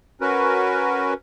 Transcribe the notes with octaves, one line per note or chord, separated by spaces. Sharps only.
C#4 F#4 A#4 B4